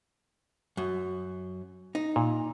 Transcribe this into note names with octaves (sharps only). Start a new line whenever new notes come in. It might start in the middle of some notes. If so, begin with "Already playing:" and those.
F#2
D#4
A#2